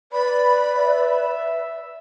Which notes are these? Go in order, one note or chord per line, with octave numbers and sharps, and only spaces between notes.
B4 D5 B5
E5